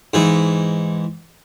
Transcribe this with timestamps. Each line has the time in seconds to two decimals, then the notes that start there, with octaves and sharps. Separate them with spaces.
0.14 G#2 E3